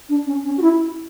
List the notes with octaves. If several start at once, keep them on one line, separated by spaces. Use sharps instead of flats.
D4
C#4
C#4
F#4
E4